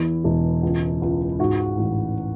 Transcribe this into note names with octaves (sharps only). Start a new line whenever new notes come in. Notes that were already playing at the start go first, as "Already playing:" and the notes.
Already playing: E2 E4
E1
C#2
C#2
G#2 F#4
A1